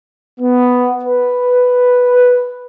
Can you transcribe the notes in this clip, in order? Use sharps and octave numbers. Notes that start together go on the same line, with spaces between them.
B3
B4